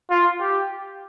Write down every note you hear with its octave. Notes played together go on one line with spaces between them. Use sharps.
F4
G4